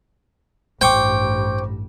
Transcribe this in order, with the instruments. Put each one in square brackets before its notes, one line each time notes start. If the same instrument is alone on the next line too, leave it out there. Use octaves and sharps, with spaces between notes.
[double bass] A1 G2 [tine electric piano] C5 C#6 D6 [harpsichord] G5